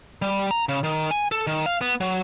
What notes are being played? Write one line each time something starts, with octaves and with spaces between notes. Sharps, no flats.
G3
A#5
C#3
D#3
G#5
A4
D#3
F5
B3
F#3